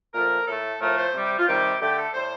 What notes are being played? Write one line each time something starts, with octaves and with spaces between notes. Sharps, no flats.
A#2 F3 A3 A#4
A2 A3 A4
A2 F3 A3 A#4
C5
C3 G3
G4
F4
C3 D#3 G3 G4
D3 A3 G4
A4
A2 G3 C5